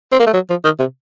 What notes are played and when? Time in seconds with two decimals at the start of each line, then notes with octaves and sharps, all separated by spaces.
0.12 C4
0.19 A#3
0.27 A3
0.34 F#3
0.50 F3
0.64 D#3
0.79 C3